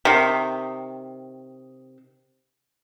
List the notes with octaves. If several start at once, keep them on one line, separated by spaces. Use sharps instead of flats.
C3 D#3